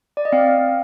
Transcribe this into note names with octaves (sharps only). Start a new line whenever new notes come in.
D5
D#5
C4 F5